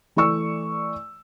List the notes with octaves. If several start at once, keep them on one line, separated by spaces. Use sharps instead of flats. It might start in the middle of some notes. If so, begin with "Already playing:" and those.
E3 A3 D5 C#6 E6